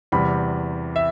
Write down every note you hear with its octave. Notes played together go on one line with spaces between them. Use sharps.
E2 C3 G3 B5
E5